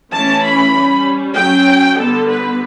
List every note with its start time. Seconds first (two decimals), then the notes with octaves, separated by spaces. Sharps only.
0.12 E3 A3 C#4 A5
0.44 B5
0.74 G3 C#4
1.36 F#3 C#4 G5
1.98 D3 G3 B3 A4
2.29 B4